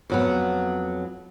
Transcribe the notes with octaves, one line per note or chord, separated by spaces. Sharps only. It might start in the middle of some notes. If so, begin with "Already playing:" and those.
F2 F#3 B3